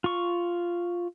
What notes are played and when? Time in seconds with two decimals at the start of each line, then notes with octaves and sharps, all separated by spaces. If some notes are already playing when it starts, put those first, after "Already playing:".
0.04 F4 C#6